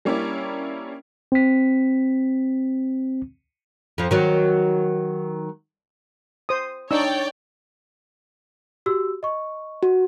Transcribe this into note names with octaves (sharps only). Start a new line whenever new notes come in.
G3 A#3 C#4 D4 E4 D5
C4 B6
F2 F3
D#3 F#3
C5 D#6
D4 D#4 C#5 D5 G5 E6
F#4 G4 E6
D#5 C#6
F#4